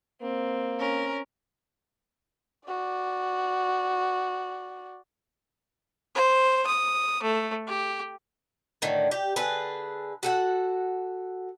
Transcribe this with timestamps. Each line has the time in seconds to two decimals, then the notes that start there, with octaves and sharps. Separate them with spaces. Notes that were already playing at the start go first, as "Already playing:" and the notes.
0.22 A#3 C4
0.79 C#4 A#4
2.68 F#4 D5
6.15 C5
6.66 D#6
7.23 A3
7.67 G4
8.82 A2 D3 D#3
9.11 G4
9.36 D3 G#4 A4 B4
10.23 F#4 A4 F#5